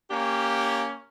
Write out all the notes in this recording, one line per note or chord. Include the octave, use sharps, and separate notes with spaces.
A#3 C#4 G4